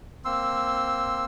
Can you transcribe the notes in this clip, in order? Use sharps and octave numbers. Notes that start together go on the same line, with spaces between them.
A#3 C4 C6 E6